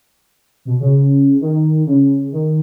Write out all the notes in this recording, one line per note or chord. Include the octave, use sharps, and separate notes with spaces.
B2
C#3
D#3
C#3
D#3